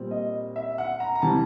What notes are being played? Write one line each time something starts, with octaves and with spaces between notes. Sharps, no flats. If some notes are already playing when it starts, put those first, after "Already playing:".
Already playing: A#2 G3 C4
D#5
E5
F#5
A#5
A#5
C3 E3 G3 A5